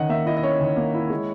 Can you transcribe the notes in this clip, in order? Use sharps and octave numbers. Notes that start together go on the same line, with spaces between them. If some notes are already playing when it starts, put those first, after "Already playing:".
Already playing: D#3 C#4 D#5 F#5
A#3 E5
E4 D#5
D#5
C#4 C#5
D#3
A#3
E4
G#3